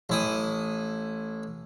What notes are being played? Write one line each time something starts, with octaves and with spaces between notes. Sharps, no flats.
A1 E4 D#6